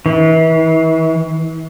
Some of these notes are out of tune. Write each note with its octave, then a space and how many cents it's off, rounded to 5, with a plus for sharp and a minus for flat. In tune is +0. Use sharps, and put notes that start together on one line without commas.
E3 -35